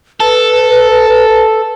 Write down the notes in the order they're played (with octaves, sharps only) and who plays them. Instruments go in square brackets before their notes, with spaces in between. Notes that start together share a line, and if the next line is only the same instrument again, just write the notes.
[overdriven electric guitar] A4 [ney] B4